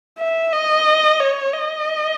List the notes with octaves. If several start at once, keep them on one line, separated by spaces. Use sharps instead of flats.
E5
D#5
C#5
D#5